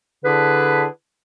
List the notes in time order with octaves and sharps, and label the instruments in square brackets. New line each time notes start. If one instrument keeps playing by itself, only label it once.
[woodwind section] D3 D4 E4 G#4 B4